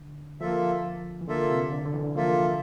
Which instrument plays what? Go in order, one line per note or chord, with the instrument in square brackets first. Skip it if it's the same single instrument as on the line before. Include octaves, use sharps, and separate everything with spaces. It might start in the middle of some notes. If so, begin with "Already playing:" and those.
Already playing: [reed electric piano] D3
[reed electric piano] F3 [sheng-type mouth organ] A#3 F4 A4 E5
[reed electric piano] E3
[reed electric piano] D3 [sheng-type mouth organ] A#3 F4 A4 E5
[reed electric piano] C3
D3
D3
E3
[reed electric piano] F3 [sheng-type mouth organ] A#3 F4 A4 E5